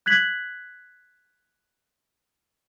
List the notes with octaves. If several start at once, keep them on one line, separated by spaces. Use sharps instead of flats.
F#6 G#6 B6 F#7